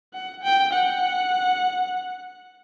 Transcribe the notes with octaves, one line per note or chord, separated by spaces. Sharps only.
F#5
G5
F#5